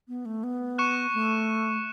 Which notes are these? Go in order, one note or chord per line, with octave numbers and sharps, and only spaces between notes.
B3
A3
B3
C#6 F#6 C#7 E7
A3